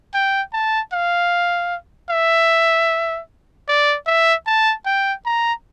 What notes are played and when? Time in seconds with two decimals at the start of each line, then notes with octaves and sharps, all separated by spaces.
0.14 G5
0.53 A5
0.93 F5
2.10 E5
3.68 D5
4.07 E5
4.47 A5
4.86 G5
5.25 A#5